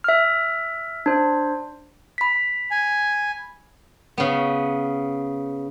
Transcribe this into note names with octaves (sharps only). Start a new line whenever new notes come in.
E5 F6
D4 C5
B5 B6
G#5
C#3 B3